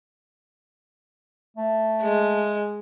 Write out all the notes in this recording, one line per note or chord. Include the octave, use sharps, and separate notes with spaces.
A3
G#3